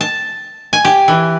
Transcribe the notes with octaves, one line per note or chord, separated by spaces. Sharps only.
A5
G#5
G4
E3